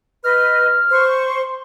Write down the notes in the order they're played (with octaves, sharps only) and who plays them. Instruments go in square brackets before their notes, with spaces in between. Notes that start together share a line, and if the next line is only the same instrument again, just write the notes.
[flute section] B4 D#5 [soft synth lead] F6
[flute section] C5 C#6
[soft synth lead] C6